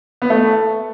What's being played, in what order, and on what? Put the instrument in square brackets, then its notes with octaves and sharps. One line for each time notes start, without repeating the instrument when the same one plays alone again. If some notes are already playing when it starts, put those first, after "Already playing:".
[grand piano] B3
A3